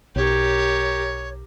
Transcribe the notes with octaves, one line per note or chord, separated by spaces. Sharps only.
B1 G4 A#4 C#5